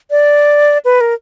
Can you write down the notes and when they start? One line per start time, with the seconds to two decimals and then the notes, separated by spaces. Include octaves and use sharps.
0.11 D5
0.85 B4
1.01 A#4